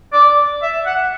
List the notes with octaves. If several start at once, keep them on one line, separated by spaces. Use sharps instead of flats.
D5
E5
F#5